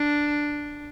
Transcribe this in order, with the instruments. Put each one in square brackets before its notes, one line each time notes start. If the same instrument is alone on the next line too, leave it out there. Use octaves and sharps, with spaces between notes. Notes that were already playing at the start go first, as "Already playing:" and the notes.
Already playing: [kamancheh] D4